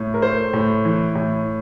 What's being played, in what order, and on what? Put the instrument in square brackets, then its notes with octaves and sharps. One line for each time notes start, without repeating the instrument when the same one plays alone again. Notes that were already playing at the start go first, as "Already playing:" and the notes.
Already playing: [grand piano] A2
A#4
A3 C5
A2
E3
A2